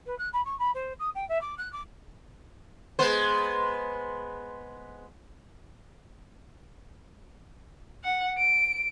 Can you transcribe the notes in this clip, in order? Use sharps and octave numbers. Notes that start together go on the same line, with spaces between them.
B4
F#6
B5
C#6
B5
C5
D#6
G5
E5
D6
F#6
D6
G#3 B3 C5
F#5
D7